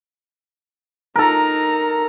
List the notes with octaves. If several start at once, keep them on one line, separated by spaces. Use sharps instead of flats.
D#4 A4 A#4 A#5